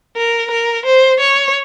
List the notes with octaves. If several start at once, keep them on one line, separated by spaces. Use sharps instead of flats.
A#4
A#4
C5
C#5